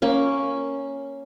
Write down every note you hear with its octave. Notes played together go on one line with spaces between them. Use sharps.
A#3 C#4